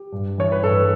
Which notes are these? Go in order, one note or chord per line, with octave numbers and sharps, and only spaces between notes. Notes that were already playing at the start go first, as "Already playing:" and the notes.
Already playing: G4
G2
E3 C#5
B4
G2 A4